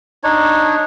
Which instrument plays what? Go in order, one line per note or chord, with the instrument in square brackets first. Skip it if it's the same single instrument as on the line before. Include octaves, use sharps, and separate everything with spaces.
[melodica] D4 D#4 C#5